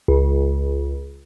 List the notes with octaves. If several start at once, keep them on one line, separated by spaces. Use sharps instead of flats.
C#2